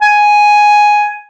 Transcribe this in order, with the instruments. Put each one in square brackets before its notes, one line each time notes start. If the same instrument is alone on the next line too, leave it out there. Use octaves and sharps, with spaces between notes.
[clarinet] G#5